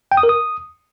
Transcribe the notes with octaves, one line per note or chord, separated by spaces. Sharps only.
G5
D#6
A#4
D#6